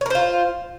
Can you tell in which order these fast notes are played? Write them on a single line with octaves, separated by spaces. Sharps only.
C#5 A#4 C5 F4